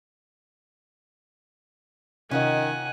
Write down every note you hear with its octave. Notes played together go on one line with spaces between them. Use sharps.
C3 D#3 C#4 F4 D#5 F#5 G#5